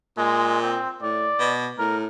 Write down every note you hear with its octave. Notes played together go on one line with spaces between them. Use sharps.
A#2 G#3
C4
A2 D5
B2
A2 A#4